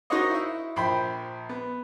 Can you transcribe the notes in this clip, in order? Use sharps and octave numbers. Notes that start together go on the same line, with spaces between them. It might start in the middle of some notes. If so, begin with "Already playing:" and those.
D#4 F#4 A#4 C5 C#5 D#5
E4 E5
A#1 C5 G5 B5
B3